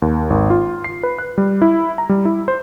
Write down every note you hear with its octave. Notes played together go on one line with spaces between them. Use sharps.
D#2
G#1
F4
C7
B4
F#6
G3
E4
A#5
G3
E4
C5